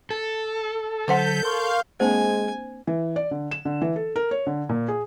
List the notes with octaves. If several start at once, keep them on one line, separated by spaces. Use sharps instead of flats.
A4
D3 F#3 C#4 C5 F#5 G6 B6
A#4 F5 C6 C#6
G#3 A#3 C4 D4 C5 G#5
E3
D5
D3
E7
D3
E3
A4
A#4
C#5
D3
A#2
G#4